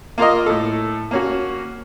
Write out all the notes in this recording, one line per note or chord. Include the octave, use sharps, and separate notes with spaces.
A#3 F4 A#4 D#5
A2 A4
A#3 C#4 F#4